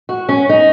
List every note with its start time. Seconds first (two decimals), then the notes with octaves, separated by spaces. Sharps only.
0.09 F#4
0.29 C#4
0.49 D#4